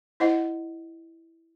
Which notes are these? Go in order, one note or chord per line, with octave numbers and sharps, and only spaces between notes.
E4 C5 D#5 F#5